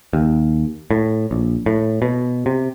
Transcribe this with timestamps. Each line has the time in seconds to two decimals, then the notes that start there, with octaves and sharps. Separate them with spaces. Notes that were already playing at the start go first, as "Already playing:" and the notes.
0.13 D#2
0.91 A2
1.31 A#1
1.66 A2
2.02 B2
2.46 C3